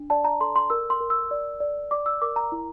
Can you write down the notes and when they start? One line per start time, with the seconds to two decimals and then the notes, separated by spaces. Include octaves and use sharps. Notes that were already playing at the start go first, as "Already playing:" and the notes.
Already playing: D4
0.10 D5 A5
0.24 A#5
0.41 A4 C6
0.56 C6
0.70 A#4 E6
0.90 C6
1.00 A#4
1.10 E6
1.31 D5
1.60 D5
1.91 D5 D6
2.06 E6
2.22 A#4 D6
2.36 A#5
2.52 E4